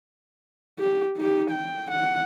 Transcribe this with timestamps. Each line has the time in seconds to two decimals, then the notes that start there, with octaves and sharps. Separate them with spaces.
0.79 G4
1.17 D#4 G4
1.51 G5
1.91 F#5